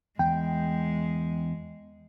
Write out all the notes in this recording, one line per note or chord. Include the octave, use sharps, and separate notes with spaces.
E2 G#3 G5